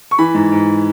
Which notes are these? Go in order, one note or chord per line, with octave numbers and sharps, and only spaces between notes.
C#6
E3 B5
G#2
G#2